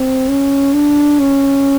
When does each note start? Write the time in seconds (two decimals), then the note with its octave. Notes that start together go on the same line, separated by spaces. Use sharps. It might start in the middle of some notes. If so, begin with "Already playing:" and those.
Already playing: C4
0.29 C#4
0.73 D4
1.19 C#4